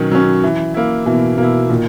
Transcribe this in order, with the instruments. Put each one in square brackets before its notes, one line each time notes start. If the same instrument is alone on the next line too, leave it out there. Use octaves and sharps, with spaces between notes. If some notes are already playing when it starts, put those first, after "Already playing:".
Already playing: [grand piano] B2 [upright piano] D#3 F#3 C#4
[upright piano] F#3 C#4
E3
A#3 E4
[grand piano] B2 [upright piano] E3
[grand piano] B2 [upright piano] A#3 E4
[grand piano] A#2 [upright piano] D#3